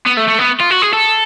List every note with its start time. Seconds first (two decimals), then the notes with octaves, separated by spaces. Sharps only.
0.06 B3
0.17 A3
0.28 A3
0.39 B3
0.61 F4
0.71 F#4
0.82 G#4
0.93 A4